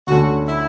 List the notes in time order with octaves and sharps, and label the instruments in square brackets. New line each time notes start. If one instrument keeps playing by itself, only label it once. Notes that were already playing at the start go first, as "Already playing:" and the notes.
[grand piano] D2 D3 A3 C#4 [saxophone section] F#4
[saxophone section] E4